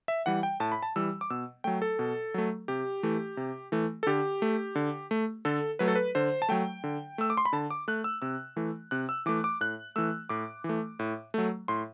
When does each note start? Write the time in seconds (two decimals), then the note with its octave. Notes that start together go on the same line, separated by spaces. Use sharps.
0.08 E5
0.26 E3 G3 F#5
0.43 G5
0.60 A2 A5
0.72 B5
0.83 A5
0.96 E3 G3 E6
1.21 D6
1.30 B2 E6
1.64 F#3 A3 G5
1.82 A4
1.99 B2
2.34 F#3 A3
2.68 C3 G4
3.03 E3 A3
3.37 C3
3.72 E3 A3
4.03 A4
4.07 D3 G4
4.42 A3
4.75 D3
5.11 A3
5.45 D3 A4
5.79 F#3 A3 B4
5.88 A4
5.96 B4
6.15 D3 C5
6.42 A5
6.49 F#3 A3 G5
6.84 D3
7.18 A3 E6
7.30 D6
7.37 C6
7.45 B5
7.53 D3 A5
7.71 D6
7.88 A3 F#6
8.04 E6
8.22 C3 E6
8.56 E3 A3
8.91 C3 F#6
9.09 E6
9.26 E3 A3 D6
9.44 D6
9.61 A2 F#6
9.96 E3 A3 E6
10.29 A2 D6
10.64 E3
10.69 A3
10.99 A2
11.34 F#3 A3
11.68 A2 C6